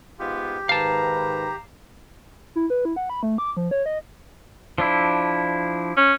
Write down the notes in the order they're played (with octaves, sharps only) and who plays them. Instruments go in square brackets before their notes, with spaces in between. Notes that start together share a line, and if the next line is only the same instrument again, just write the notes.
[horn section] G#2 B3 F4 [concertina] G4
[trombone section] G#2 D#3 B4 [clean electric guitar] F5 A5 [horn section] A#5
[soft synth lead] E4
B4
E4
F#5
B5
A3
D6
F3
C#5
D#5
[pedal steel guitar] F3 D4 E4
[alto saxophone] C#4